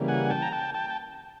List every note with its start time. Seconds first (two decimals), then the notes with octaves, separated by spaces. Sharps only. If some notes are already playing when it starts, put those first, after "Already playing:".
Already playing: C#3 E3 G3 A#3
0.08 F#5 G#5
0.30 G5 A5
0.42 A#5
0.52 G5 A5
0.74 G5 A5
0.90 A5